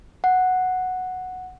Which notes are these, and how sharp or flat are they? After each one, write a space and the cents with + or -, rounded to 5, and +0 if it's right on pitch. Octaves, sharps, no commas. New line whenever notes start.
F#5 -5